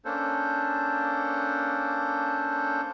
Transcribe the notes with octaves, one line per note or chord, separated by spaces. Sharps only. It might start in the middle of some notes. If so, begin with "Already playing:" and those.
A#3 C#4 D4 A4 C5